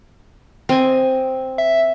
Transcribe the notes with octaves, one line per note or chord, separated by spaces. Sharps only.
C4 D#5 G#5
E5